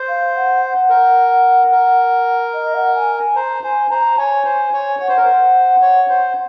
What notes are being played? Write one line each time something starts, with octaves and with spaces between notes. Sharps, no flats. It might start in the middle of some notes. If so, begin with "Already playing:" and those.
Already playing: C5
F5
F#5
F#5
A#4
A#4
D#5
F#5
G#5
G#5
C5 A#5
C5 G#5
C5 A#5
C#5 G#5
C5
C#5
C#5 F#5
C5
A#4
C5
C#5
C5